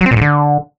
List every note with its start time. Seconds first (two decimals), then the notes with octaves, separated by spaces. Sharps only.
0.01 F#3
0.06 C4
0.11 A#2
0.16 G#2
0.21 D3